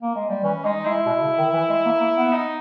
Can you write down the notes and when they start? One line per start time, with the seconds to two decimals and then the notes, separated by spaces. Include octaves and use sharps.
0.01 A#3
0.15 G#3
0.29 G3
0.43 E3 C#4
0.65 G#3 D#4
0.85 G#3 E4
1.06 B2
1.22 C#3
1.38 D#3
1.53 E3
1.69 G#3
1.86 A#3
2.01 A#3
2.17 B3
2.33 D#4